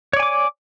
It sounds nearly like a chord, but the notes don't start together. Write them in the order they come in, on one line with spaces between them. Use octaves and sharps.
C#5 D5 G#5 D6